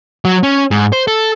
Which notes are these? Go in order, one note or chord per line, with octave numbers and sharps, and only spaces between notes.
F#3
C#4
G#2
C5
A4